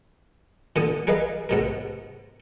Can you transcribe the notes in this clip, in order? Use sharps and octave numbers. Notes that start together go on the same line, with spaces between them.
A#2 D3 D#6
G#4 A#4 B4 D#5 F5
G#2 B2 A#4